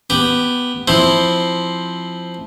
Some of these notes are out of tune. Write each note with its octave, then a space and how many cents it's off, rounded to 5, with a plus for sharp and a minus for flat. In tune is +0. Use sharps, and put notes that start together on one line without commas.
B3 +0 G4 +0
F3 +0 C4 +0 E4 +0